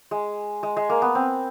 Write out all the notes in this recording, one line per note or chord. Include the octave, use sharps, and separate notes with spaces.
G#3
G#3
G#3
A#3
B3
C4